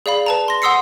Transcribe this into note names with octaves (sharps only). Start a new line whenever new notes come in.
G#4 D5 F5 B5
B4 A5 A#5
C6 A#6
F#5 C6 D#6 E6 C7 C#7